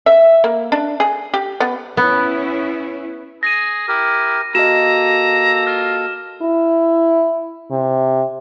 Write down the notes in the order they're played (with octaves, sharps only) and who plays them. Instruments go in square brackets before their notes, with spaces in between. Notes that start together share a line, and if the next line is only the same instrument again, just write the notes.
[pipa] E5
A#3
D4
G#4
G4
B3
[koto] B3 [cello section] C#4 E4
[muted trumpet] G#4 [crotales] A#6 D#7
[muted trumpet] E4 [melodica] G4 A#4
[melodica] A#3 A4 [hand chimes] F#4 G4 D#5 [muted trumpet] A#5 [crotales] E7
[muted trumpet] F4 [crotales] F6
[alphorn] E4
C3